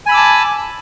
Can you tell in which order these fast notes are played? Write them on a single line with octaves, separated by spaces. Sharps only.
G#5 B5 E6 D6 A5